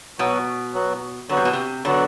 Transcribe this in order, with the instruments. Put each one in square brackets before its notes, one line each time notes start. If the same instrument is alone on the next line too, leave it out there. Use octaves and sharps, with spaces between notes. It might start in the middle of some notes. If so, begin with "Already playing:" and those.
[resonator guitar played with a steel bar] B2 [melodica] F#3 B3 F#4
[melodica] F#3 B3 F#4
[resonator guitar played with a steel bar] D3 [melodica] F#3 B3 F#4
[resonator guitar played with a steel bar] C3
B2
C3
[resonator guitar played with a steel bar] D3 [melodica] F#3 B3 F#4